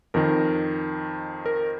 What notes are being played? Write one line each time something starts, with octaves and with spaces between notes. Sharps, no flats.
F2 D#3 A#4
A#4